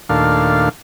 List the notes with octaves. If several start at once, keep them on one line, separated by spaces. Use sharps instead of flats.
D#2 A#2 A3 D4 F5